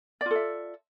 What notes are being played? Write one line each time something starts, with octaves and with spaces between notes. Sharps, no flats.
F4 A4 D5 E5